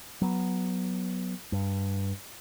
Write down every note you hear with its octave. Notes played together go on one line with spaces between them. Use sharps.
F#3 B3
G2